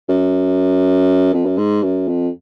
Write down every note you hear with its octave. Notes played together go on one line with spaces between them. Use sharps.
F#2
F2
F#2
G#2
F#2
F2